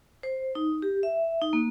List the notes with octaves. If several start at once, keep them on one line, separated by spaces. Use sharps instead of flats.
C5
D#4
G4
E5
D#4
A#3